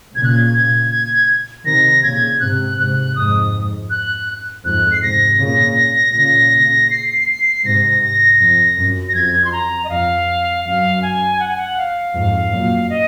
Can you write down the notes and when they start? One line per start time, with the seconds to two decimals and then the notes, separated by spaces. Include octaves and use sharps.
0.15 A#2 C#3 G#6
0.24 F#6
0.32 G#6
0.54 G#6
0.91 G#6
1.65 C3 D#3 A#6
2.03 A#2 C#3 G#6
2.40 G#2 C3 F#6
2.77 G#2 C3 F#6
3.16 F2 G#2 D#6
3.90 F#6
4.65 F2 G#2 F#6
4.92 C7
5.03 G#2 C3 A#6
5.40 A#2 C#3
6.14 A#2 C#3
6.91 C7
7.64 G#2 C3 A#6
8.02 A#6
8.40 F2
8.78 F#2
9.09 A#6
9.15 F2 G#6
9.45 C6
9.52 A#5
9.84 D#5
9.89 F2 F5
10.65 F#2 F5
11.02 G#5
11.40 F#5
11.48 G#5
11.57 F#5
11.77 F5
12.14 F2 G#2
12.51 F#2 A#2
12.90 D#5